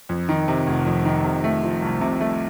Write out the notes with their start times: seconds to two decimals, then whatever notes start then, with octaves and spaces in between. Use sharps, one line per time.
0.09 F2
0.29 D#3
0.48 C3
0.67 F1
0.86 F2
1.05 D#3
1.24 C3
1.44 A3
1.64 F3
1.82 C2
2.01 C3
2.21 A3